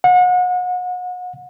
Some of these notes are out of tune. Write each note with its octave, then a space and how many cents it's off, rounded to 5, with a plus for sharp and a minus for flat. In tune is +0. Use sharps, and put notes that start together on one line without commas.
F#5 -35